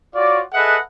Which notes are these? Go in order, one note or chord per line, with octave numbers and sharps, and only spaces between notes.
F4 F#4 C#5 D5
G#4 A4 B4 D#5 E5 F#5